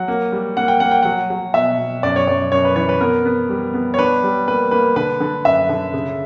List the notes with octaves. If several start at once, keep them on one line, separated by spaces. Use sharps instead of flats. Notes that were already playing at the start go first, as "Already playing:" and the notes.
Already playing: F#3 F#5
A#3
G3
A#3 F#5
G5
A#3 F#5
G5
F#3 F#5
F#3
B2 E5
B2
F#2 D5
C#5
F#2 D5
F#2 C#5
B4
E3 C#5
B4
B3 A#4
B3
G3
B3
C#5
D4 B4
G3
A#3 B4
A#3 B4
D3 B4
D3
F#2 E5
D3
C#3